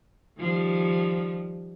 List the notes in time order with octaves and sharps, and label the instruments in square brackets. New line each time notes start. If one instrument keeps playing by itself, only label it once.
[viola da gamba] D#3 F3 G3